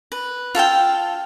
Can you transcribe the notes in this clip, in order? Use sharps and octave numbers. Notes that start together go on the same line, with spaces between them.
B4
F4 A4 F5 G5